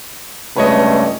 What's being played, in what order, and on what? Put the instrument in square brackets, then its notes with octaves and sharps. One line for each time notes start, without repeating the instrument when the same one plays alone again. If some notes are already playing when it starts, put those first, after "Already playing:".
[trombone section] C#2 G2 A3 [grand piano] B4 C#5 D#5